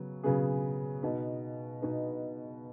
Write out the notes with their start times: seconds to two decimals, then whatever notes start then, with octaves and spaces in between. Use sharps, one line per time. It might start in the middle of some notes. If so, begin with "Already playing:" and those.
Already playing: C#3 F#3 B3
0.23 C#3 F#3 B3 G#4
1.02 B2 B3 D#4 B4
1.82 B2 B3 D#4 B4